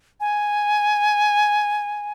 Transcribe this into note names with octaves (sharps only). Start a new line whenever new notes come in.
G#5